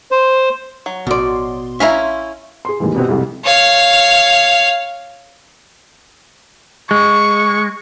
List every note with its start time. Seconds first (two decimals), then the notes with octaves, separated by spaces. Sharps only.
0.11 C5
0.86 F#3
1.07 A1 B2 D5 C6
1.80 C#4 E4 E5 F5 A#5
2.65 G#4 C6
2.80 D#2 G#2 E3
2.94 G2 B2 B3 C4
3.09 C2 F2 G#2
3.44 C#5 F5
6.91 G#3 C#6